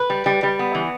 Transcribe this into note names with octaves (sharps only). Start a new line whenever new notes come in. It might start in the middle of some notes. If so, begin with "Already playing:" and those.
Already playing: B4
G3
G3
G3
B3
E3